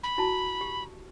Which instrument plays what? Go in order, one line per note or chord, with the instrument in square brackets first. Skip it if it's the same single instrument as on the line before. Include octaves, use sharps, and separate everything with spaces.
[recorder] B5
[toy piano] E4 F#4 A5
G4